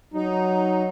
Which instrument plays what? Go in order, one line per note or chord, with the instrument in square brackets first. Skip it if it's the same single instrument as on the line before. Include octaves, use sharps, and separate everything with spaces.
[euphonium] F#3 [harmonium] D#4